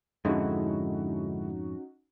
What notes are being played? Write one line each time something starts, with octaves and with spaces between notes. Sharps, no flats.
F2 G#2 D3 G#3 C#4 D#4 E4 F#4